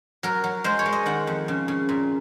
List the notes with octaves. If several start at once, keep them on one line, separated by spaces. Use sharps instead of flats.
F#3 A#4
F#3
G#3 C5
C#5
G#3
D#5
D#3 F#5
F2
C#3
C#3
A#2